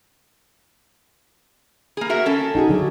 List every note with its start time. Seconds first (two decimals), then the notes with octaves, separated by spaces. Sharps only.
1.97 A#3 G#4
2.10 F#4 A#4 E5
2.26 C#4 A4
2.55 D#4 F#4 G#4
2.69 D3 F#3